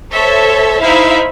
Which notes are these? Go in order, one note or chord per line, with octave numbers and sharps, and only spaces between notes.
A4 C5 C#5 E5
D#4 E4 C5 E5 F5 B5